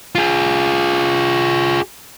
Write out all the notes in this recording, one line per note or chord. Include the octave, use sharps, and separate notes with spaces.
F4 G#4